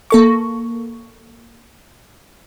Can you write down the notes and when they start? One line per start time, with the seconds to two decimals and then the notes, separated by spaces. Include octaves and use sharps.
0.10 A#3 A4 C#6